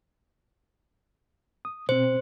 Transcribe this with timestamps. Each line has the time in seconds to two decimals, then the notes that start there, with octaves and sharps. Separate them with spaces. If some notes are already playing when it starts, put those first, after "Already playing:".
1.65 D#6
1.89 B2 C4 C5